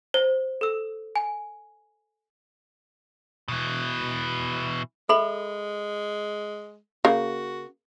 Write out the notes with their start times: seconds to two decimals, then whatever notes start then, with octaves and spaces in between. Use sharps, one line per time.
0.14 C5
0.61 A4 E6
1.16 G#5
3.48 B2 E3
5.09 G#3 A4 E5 B5 E6 F#7
7.05 C#3 A#3 F#4